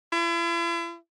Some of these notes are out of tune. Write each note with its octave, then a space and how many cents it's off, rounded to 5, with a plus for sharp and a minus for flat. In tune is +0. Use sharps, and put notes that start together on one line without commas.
E4 +45